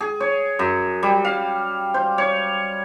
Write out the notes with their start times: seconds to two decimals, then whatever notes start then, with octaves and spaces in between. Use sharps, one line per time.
0.01 G#4
0.20 C#5
0.59 F#2
1.03 G3
1.25 F5
1.94 C5
2.18 C#5